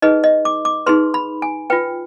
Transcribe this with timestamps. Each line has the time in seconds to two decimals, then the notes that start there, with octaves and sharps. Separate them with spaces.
0.02 D#4 G#4 B4 D#5
0.24 D#5
0.45 D6
0.65 D6
0.86 D#4 G#4 B4 C6
1.14 B5
1.42 G#5
1.70 F4 B4 G5